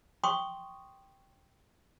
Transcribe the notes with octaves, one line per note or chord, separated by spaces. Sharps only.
G5 C6 C#6 D#6